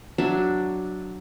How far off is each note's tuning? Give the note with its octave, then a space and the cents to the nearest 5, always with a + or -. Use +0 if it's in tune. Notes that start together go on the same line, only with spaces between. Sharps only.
F#3 +5 D4 +5 E5 +0